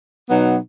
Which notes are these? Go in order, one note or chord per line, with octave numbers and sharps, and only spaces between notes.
B2 F#3 B3 D#4